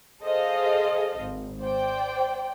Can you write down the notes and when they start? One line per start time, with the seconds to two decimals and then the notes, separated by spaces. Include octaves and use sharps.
0.22 G#4 A4 C5 D#5 F5
1.19 G#1
1.61 C5 D5 G5